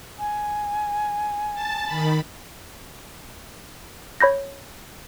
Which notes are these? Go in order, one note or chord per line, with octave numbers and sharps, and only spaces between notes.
G#5
A5 A6
D#3 B5
C#5 B5 G6 A#6